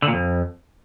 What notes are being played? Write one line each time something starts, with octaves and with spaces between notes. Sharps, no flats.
D3
A#2
F2